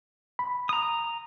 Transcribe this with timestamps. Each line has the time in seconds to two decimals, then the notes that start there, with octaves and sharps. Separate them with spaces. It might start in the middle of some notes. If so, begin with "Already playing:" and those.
0.39 B5
0.69 A#5 D#6